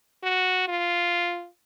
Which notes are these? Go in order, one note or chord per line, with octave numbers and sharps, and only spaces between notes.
F#4
F4